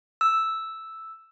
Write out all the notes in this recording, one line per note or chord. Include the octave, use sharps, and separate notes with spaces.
E6